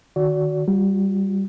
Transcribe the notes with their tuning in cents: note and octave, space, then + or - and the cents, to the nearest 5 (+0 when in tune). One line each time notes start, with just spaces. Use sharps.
D#3 -30 F#4 +0 D5 -35
G3 +0 F4 +45